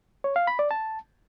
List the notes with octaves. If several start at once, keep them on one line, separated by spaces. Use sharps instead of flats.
C#5
F5
B5
D5
A5